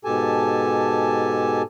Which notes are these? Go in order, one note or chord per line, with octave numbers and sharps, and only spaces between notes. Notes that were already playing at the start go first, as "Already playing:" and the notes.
G#2 B2 G4 A4 G#5 A5